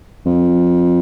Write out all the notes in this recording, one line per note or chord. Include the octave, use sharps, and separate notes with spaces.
F2